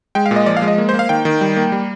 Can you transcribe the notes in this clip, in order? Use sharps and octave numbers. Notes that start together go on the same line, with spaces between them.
G#3 G5
F5
A#2
D#5
F3 D5
F5
G#3
D#5
A#3
C5
A#3
F5
D#3 G5
D#3
G3
A#3
G3